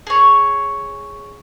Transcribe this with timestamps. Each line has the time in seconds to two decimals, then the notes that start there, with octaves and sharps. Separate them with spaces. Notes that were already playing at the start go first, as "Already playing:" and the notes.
0.07 G#4 C#5